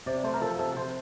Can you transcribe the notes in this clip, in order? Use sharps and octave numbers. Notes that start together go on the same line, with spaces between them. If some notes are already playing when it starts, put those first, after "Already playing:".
C3 D5
A3 C5
A#4
F3 A4
C3 A4
C3 C5